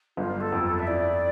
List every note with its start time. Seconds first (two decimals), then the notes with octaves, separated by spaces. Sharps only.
0.17 G1 F4
0.40 A4
0.52 F2
0.64 A4
0.79 E5
0.87 E4 D5